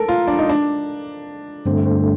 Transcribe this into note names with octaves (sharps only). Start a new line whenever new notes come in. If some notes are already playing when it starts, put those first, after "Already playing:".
Already playing: A4 A#4
F4
D4
D#4
D4
G2 D3 A3 C4
C4